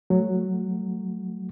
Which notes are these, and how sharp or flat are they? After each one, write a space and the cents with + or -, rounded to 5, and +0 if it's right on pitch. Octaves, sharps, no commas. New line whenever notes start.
F#3 +0 A3 +0 F#4 +0